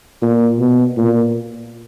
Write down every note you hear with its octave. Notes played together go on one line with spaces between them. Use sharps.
A#2
B2
A#2